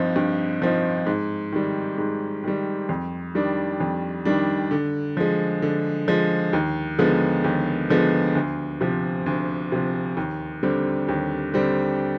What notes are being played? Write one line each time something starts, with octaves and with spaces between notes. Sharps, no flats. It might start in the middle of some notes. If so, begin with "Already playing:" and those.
Already playing: G2 F3 C4 D#4
G2
F3 C4 D#4
G#2
D#3 G3
G#2
D#3 G3
F2
D#3 G3 D4
F2
D#3 G3 D4
D3
F3 G#3
D3
F3 G#3
D#2
D3 F3 G#3 B3
D#2
D3 F3 G#3 B3
D2
C3 F3
D2
C3 F3
D#2
D3 G3 C4
D#2
D3 G3 C4